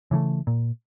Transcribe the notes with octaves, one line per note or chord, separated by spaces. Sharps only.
C#3 E3 F#3 A3
A#2